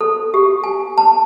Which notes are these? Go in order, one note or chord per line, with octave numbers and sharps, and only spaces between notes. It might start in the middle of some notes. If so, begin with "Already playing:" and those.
A4
G4
G#5
A5